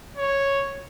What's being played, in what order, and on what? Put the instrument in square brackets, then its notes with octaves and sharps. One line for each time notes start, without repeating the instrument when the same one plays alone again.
[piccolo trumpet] C#5